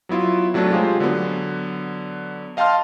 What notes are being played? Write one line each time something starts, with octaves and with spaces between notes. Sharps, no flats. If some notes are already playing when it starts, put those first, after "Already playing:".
F#3 B3 E4 F4
C3 F#3 A3 D4
G#3 F4 G4 G#4 C5
D3 F#3 B3
D#5 F5 G5 A5 C6 F6